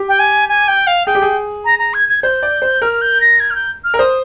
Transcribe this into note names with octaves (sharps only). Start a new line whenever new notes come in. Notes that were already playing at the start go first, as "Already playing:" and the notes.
Already playing: G4
G5
G#5
G#5
G5
F5
G#4 G5
G4
G#4
A#5
A#5
G#6
G#6
C5 G6
D5
C5
A#4 F6
G6
A#6
G#6
F6
G6
F6
A#4
C5 D#6